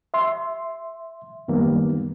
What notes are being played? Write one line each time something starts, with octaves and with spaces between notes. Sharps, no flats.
E5 C6
F#2 D#3 G3 A#3 B3